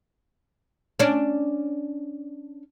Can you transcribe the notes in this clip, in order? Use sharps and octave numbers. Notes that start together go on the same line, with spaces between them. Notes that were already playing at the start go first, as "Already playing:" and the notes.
C#4 D4